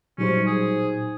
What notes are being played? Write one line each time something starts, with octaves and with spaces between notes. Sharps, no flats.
A#2 F#3 G3 C#4 D#4 C5
G#4